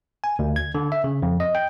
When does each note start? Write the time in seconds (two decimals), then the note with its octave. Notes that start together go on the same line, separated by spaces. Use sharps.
0.24 G#5
0.39 D2
0.56 G#6
0.75 D3
0.92 E5
1.04 C#3
1.22 F2
1.40 D#5
1.55 G5